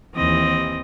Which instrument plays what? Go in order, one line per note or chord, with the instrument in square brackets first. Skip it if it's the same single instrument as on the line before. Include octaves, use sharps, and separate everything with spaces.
[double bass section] D#2 E3 [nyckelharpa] C4 D#5